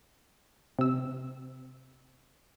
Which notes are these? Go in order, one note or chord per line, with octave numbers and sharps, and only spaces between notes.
C3 E6